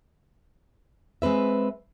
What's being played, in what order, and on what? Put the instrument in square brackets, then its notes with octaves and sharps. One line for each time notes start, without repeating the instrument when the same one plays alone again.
[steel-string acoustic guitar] G#3 C4 B4 E5